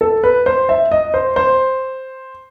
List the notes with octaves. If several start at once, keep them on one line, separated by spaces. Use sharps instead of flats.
A4
B4
C5
E5
D#5
C5
C5